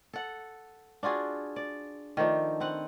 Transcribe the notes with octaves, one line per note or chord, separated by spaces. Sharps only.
A4 F#5
D4 F4 F#4 G#4
D5
D#3 F3 A3 D4
C4 B4 F#5